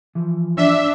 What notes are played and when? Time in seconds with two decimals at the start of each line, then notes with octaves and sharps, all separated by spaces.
0.15 E3 F3
0.57 D4 E5